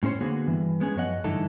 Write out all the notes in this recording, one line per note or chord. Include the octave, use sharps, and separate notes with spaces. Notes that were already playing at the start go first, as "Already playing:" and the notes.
A2 C#4 G4 C5 C#5
D3 A#3 B3 F#4 G#4
G2 E3
G#3 B3 C#4 G#4
F#2 F3 C#5 D#5 F#5
G2 D3 E3 A3 D#4 A4